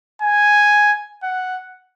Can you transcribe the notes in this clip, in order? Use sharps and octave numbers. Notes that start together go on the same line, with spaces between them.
G#5
F#5